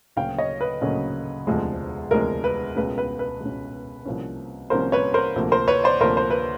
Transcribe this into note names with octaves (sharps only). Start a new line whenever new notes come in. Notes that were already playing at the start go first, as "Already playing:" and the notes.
D2 C#3 F#3 A#3 C#4 F5 G5
C#5 D#5
B4
D2 C#3 F#3 A#3 C#4
E1 D2 C3 F3 G#3
E1 D2 C3 F3 G#3 A#4
B4
C#2 B2 G#3 C#4 B4
B4
B4
C#2 B2 G#3 C#4
C2 C3 F3 A#3 C#4
C2 C3 F3 A#3 C#4 A#4 C5
B4 C#5
A#4 C5
D2 C3 F3 A#3
A#4 C5
B4 C#5
C5 D5
D2 C3 F3 A#3 A#4 C5
C5
B4